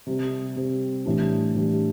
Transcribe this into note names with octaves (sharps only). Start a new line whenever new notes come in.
C3 G3 C4
C3 G3 C4
A2 E3 G3 D4
A2 E3 G3 D4